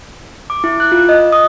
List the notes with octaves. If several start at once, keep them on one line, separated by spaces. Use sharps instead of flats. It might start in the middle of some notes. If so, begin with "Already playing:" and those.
D6
E4
F#6
F4
D#5
D#6